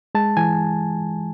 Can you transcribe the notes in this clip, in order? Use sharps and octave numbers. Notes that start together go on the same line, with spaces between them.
G#3 A5
E3 G#5